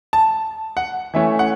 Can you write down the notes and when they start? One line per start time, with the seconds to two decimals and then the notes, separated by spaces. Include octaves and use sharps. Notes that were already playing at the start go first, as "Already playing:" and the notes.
0.13 A5
0.77 F#5
1.14 E3 A3 C#4 E5
1.39 F#5